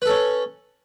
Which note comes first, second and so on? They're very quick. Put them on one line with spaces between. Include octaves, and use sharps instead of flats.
B4 A4 C#4